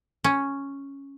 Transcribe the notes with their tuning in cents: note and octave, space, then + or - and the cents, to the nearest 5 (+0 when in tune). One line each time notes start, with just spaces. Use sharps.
C#4 +0